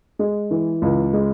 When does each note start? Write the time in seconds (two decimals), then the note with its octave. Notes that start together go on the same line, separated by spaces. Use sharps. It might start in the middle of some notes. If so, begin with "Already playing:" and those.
0.19 G#3
0.51 E3
0.82 C#2
1.13 G#3